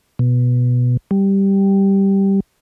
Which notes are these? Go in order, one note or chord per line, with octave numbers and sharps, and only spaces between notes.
B2
G3